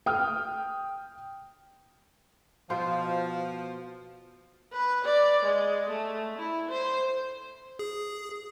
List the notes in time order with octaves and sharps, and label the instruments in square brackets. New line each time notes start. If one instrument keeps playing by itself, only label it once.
[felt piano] G5 D#6 F6
[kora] B2 F4 C5 [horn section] F3
[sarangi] B4
D5
G#3
A3
E4
C5
[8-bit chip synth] G#4